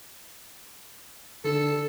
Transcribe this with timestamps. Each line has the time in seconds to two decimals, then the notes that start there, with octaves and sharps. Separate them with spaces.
1.45 D3 D4 A4 E7